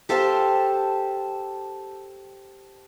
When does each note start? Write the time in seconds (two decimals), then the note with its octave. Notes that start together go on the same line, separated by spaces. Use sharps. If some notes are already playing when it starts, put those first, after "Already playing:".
0.09 G4 A4 C5 F5 G5 A5